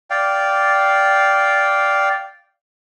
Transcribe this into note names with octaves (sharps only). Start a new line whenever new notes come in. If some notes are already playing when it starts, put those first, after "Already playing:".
D5 F5 G5